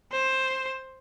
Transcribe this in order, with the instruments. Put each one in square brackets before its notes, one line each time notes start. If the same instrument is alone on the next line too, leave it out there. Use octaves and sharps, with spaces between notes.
[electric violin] C5